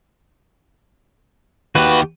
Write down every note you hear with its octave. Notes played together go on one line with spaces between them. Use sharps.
D#2 F#4 G4 B4